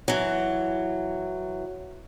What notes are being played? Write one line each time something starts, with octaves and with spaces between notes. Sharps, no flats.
E3 F#3